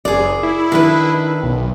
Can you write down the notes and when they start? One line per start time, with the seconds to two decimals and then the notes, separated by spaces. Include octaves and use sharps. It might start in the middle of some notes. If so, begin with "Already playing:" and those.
0.05 F#1 G#4 D5
0.43 E4
0.72 D#3 D4 B4
1.43 B1